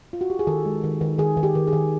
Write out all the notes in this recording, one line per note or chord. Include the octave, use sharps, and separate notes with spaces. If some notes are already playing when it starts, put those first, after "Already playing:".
F4
F#4
G4
G#4
D#3 A4
G#3
D#3
D#3
D#3 G#4
D#3
G4
D#3
G#4
D#3